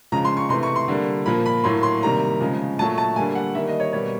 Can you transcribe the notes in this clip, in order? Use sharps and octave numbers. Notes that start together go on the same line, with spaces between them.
C#3 F3 G#3 A#5
C6
C#6
C3 E3 A3 C6
C#6
C6
D3 G3 A#3
A#2 F3 A#3 B5
B5
A2 F#3 A#3 C6
C6
C3 D#3 G3 A#3 A#5
C#3 F3 G#3
A#2 F#3 A3 A5
A5
D3 G3 A#3 G#5
F#5
D#3 G3 A#3 E5
D#5
C#5
B2 G3 A#3 C#5